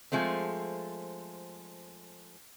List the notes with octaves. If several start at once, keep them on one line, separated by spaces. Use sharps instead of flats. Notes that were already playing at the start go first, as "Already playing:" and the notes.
F3 G#3 A3 C4